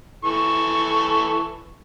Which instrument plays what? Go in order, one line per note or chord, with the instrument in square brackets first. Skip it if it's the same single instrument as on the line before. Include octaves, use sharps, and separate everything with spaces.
[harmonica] E3 A4 C#6